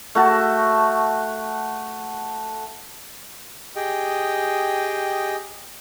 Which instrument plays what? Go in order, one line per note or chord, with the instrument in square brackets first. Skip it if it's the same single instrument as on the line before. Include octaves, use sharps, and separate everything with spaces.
[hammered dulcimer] A3 F#4 A5
[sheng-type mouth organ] G4 G#4 D#5 G5